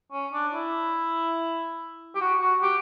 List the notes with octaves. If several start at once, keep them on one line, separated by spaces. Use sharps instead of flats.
C#4
D4
E4
G4
F#4
F#4
G4